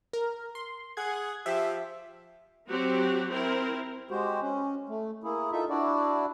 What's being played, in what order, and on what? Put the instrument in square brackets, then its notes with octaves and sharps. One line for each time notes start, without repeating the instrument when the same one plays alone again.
[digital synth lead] A#4
C6
[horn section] G#4 F#5 [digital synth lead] G#6
[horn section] F3 G4 [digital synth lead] E5
[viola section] F#3 C4 F#4 G4
C4 E4 A#4
[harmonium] G#3 F#4 G4 C5
C#4
A3
A#3 E4 G#4
D#4 F4 A4 E5
D4 E4 F#4 D5